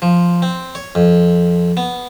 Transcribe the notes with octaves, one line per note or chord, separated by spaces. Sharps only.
F3
C4
C#5
F2
B3